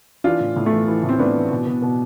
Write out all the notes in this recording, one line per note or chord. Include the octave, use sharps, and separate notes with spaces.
E3 D4 F4
A2
A2
A3
E3
E3
A2
C4
A2 B3 D4
E3
B2
B2
B2